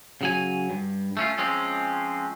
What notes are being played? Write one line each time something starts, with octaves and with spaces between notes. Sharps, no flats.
C#3 F#3 G#5
G2
A3 C#4 F4
F3 G#3 C4 C#4